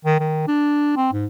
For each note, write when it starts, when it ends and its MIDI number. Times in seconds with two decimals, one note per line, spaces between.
0.05 0.18 51
0.20 0.44 51
0.48 0.95 62
0.96 1.10 60
1.12 1.26 44